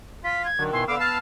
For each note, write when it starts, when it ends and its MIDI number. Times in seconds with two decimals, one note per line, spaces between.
0.24 0.47 65
0.24 0.43 95
0.45 0.64 92
0.59 0.71 50
0.59 0.85 51
0.59 0.71 54
0.73 0.85 47
0.73 0.85 64
0.73 0.85 80
0.73 0.84 84
0.88 0.98 50
0.88 1.19 59
0.88 0.98 77
0.88 0.95 86
0.88 1.19 88
1.00 1.18 77
1.00 1.18 81
1.00 1.18 89